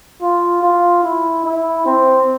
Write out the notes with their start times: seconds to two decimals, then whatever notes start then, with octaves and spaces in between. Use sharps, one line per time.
0.21 F4
0.62 F4
1.04 E4
1.45 E4
1.86 C4